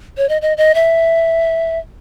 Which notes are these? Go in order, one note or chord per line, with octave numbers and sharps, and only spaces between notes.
C#5
D#5
D#5
D#5
E5